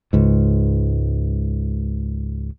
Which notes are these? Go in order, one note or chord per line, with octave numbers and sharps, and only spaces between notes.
C#2 G#2